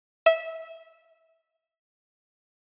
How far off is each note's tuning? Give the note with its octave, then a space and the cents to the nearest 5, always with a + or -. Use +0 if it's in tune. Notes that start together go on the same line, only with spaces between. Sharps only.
E5 -20